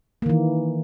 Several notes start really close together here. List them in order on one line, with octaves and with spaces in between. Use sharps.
A#3 D#3 E3